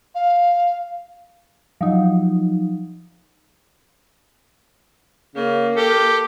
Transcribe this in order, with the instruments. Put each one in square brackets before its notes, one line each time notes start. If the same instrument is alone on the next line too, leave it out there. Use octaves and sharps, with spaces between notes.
[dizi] F5
[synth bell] F3 F#3 D#4
[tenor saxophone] C#3 [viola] A#3
[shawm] G4 [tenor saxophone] A4